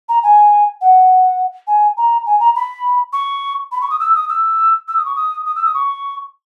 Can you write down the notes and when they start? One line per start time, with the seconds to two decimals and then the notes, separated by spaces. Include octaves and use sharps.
0.09 A#5
0.23 G#5
0.81 F#5
1.67 G#5
1.97 A#5
2.26 G#5
2.40 A#5
2.55 B5
3.13 C#6
3.72 B5
3.81 C#6
3.90 D#6
4.00 E6
4.15 D#6
4.29 E6
4.88 E6
4.97 D#6
5.05 C#6
5.16 D#6
5.46 D#6
5.56 E6
5.65 D#6
5.74 C#6